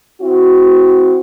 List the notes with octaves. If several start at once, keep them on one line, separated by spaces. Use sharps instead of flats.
C4 E4 F#4